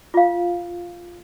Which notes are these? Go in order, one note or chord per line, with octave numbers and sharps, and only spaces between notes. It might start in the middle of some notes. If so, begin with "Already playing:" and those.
F4 F5